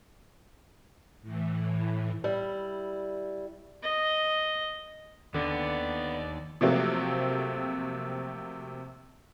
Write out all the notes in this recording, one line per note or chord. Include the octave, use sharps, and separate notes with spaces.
A2 E3
G3 E4
D#5
D#2 D3 B3 D5
C3 F3 F#3 A3 A#3 C4